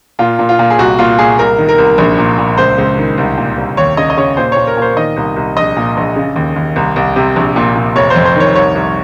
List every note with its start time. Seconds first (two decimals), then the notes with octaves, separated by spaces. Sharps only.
0.19 A#2 F4
0.39 A#2
0.49 F4
0.59 A#2
0.70 G#4
0.79 C2 F#4
0.98 A#2 F4
1.19 A#2 G#4
1.39 C2 A#4
1.58 D#3
1.69 A#4
1.78 C2
1.98 A#1
2.18 A#2
2.38 A#2
2.58 C#2 C5
2.78 C#2
2.98 D#3
3.18 C2
3.38 A#2
3.57 C2
3.77 D#2 C#5
3.97 C#3 D#5
4.10 D#5
4.17 C#3 C#5
4.37 A#2 C5
4.52 A#2 C#5
4.67 A#4
4.77 A#2 C5
4.97 D#3 D#5
5.17 C2
5.36 C2
5.56 A#1 D#5
5.77 A#2
5.97 A#1
6.16 C#3
6.36 D#2
6.56 D#2
6.76 C2
6.96 C2
7.16 C3
7.36 A#1
7.56 A#2
7.75 A#2
7.96 F1 C#5
8.10 C5
8.16 F2
8.25 C5
8.36 D#3 C#5
8.56 C2 C#5
8.75 C2